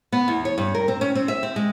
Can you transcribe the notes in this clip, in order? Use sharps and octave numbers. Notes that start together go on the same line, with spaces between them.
B3
E2
C#5
G2
A#4
C4
C#4
C4
E5
C4
G#3